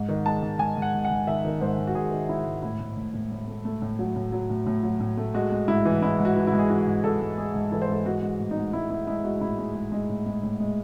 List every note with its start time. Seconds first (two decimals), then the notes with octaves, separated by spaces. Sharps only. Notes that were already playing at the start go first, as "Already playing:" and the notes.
Already playing: G#2
0.09 D#3
0.26 G#3 A5
0.42 G#2
0.59 G#2 G#5
0.77 G#2
0.82 F#5
0.94 G#2
1.05 F#5
1.10 G#2
1.27 D#3 E5
1.45 D#3
1.61 G#2 C5
1.78 G#2
1.87 F#4
1.95 G#2 G#4
2.12 D#3
2.29 G#3 E4
2.46 G#2
2.63 A2 E4
2.80 A2
2.97 A2
3.14 A2
3.31 A2
3.47 A3
3.65 A3
3.82 A2
3.99 F#3
4.16 A2
4.32 F#3
4.50 A2
4.67 A2
4.83 F#3
5.00 A2
5.17 A3
5.34 G#3 F#4
5.52 G#3
5.68 G#2 E4
5.85 E3
6.02 G#3 E4
6.19 G#2
6.25 F#4
6.36 E3
6.47 E4
6.53 G#2
6.59 G#4
6.70 E3 F#4
6.87 G#2
7.04 G#2 A4
7.21 G#2
7.38 G#3 G#4
7.55 G#2
7.72 E3 A4
7.82 C5
7.88 G#2 A4
8.05 G#3 F#4
8.22 G#3
8.40 A2
8.51 D#4
8.57 G#3
8.73 G#3 E4
8.90 G#3 E4
9.07 G#3 E4
9.24 G#3 F#4
9.41 A2 E4
9.58 G#3
9.75 G#3
9.92 G#3
10.09 A2
10.26 G#3
10.43 A2
10.60 G#3